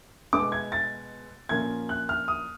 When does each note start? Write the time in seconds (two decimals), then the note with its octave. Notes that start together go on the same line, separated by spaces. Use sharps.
0.33 B2 G#3 B3 D6
0.52 G#6
0.72 A6
1.49 A#2 F3 A#3 C#4 G#6
1.89 F#6
2.09 F6
2.28 D#6